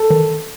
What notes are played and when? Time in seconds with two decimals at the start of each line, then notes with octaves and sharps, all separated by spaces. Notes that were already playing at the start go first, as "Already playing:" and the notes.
Already playing: A4
0.10 D#3